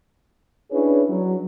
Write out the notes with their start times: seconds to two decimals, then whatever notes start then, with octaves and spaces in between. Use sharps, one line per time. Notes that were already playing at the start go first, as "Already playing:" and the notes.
0.71 C#4 D4 E4 G#4 B4 C#5
1.09 F#3